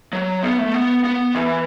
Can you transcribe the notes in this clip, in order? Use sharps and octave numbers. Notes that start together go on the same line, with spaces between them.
F#3
B3
A3
B3
B3
E3